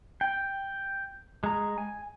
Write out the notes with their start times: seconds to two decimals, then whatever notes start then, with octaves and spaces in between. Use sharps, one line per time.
0.21 G5
1.44 G#3 A#5
1.78 G#5